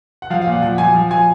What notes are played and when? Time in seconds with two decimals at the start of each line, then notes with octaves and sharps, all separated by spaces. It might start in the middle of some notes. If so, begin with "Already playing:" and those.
0.22 F#5
0.30 F3 F5
0.42 F5
0.47 A#2 F#5
0.62 F3 F#5
0.78 F3 G#5
0.94 F3
1.10 F3 G#5